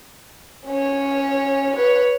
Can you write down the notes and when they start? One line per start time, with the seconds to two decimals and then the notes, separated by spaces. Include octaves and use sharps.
0.67 C#4 C#5
1.76 B4 C#5